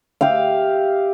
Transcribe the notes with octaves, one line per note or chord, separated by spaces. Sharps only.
G4 E5 F5